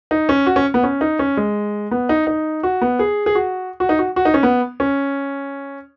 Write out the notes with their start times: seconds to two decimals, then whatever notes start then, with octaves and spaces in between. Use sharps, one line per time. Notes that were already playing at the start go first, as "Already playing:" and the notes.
0.11 D#4
0.29 C#4
0.46 F#4
0.56 C#4
0.74 B3
0.84 C#4
1.01 D#4
1.19 C#4
1.37 G#3
1.91 B3
2.09 D#4
2.27 D#4
2.63 F#4
2.81 B3
2.99 G#4
3.26 G#4
3.35 F#4
3.80 F#4
3.89 D#4
3.99 F#4
4.16 F#4
4.25 D#4
4.34 C#4
4.43 B3
4.80 C#4